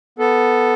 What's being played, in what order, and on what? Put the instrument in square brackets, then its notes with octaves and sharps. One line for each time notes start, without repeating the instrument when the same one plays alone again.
[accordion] B3 A4